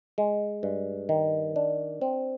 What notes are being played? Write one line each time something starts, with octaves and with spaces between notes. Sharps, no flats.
G#3
G2
D#3
D4
C4